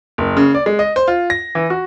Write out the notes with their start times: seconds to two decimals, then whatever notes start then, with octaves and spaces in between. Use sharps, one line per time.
0.18 F#1
0.37 C#3
0.55 D5
0.66 G#3
0.79 D#5
0.96 C5
1.08 F4
1.30 A#6
1.55 E3
1.70 F#4